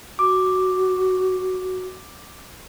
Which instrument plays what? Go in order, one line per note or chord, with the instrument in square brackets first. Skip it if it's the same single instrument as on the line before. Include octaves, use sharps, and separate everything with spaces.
[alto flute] F#4 [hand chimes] D6